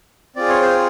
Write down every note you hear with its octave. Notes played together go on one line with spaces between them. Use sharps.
C4 F4 G#4 D5
C#5
C5